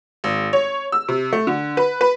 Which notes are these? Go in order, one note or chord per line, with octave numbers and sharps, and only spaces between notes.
G#1
C#5
E6
C3
A3
D3
B4
B4